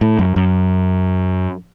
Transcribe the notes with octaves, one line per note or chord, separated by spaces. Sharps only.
A2
F#2
F#2